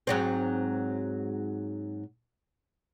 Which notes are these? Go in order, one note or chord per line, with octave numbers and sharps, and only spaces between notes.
G#2 F#3 C4